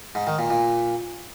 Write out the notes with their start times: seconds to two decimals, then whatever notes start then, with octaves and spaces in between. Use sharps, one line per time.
0.15 G#2
0.27 D#3
0.39 A#2
0.50 A#2